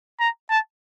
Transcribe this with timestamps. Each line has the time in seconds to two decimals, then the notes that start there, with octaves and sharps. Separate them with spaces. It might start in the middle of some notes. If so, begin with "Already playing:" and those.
0.20 A#5
0.50 A5